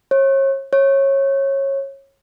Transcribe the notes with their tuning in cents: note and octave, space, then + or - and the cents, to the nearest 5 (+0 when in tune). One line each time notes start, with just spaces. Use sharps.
C#5 -35
C#5 -20